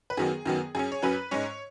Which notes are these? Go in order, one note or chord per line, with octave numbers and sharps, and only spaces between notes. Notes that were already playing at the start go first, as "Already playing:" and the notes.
B4
F#2 D#3 F#3 B3 G#4
F#2 D#3 F#3 B3
F#2 F#3 C#4 G#4
C#5
F#2 F#3 C#4 B4
G#2 G#3 C#4 C#5